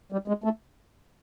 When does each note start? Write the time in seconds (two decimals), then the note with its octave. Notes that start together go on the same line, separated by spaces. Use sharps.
0.12 G3
0.28 G#3
0.44 A3